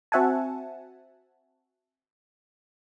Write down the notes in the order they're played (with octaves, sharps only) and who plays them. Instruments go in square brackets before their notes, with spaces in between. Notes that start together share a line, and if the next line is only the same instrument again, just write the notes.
[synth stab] C4 F#4 E5 F#5 G#5 A5